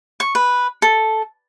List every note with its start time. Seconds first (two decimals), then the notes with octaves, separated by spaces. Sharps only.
0.20 C#6
0.35 B4
0.82 A4